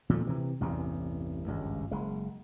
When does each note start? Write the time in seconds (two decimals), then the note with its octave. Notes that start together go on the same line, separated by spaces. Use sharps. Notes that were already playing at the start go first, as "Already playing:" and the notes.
0.09 A#2 F3 G#3 A3
0.27 C3 E3
0.61 A1 E2 G2 C3
1.46 G#1 C#2 G2
1.91 F#1 G#3